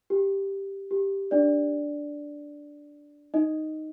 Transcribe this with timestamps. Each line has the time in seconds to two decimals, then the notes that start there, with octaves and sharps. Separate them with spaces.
0.10 G4
0.91 G4
1.31 D4 D5
3.34 D#4 D#5